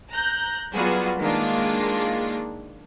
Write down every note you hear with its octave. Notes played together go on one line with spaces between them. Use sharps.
A#5 F#6 G6
F#3 G3 B3 F4 F#4 G#4
D#3 G#3 A#3 D4 F4